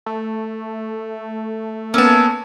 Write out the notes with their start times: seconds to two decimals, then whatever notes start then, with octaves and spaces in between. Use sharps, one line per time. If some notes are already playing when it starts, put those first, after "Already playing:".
0.06 A3
1.94 A#3 B3 C#4 A5 E6